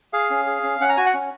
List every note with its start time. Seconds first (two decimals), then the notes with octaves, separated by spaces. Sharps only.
0.13 G#4 F5
0.30 C#4
0.47 G#4
0.64 C#4
0.81 C#4 F#5
0.89 A#5
0.97 F#4 G#5
1.06 F#5
1.14 C#4